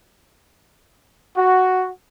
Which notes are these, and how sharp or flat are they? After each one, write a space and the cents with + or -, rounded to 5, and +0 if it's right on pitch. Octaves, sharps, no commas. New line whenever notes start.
F#4 +0